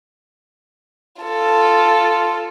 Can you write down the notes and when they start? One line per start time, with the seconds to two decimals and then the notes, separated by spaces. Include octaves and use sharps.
1.22 F4 A4